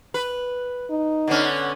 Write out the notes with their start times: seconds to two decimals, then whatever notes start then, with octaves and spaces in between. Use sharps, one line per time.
0.14 B4
0.90 D#4
1.27 D3 B3 C#4